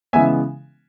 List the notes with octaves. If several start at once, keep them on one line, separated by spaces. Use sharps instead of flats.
C#3 E3 G#3 B3 E5 G#5